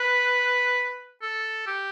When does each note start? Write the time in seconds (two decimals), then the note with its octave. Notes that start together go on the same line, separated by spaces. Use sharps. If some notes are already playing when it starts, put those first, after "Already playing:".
Already playing: B4
1.22 A4
1.67 G4